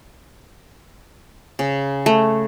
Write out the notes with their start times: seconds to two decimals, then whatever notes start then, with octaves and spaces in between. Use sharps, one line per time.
1.59 C#3
2.06 A3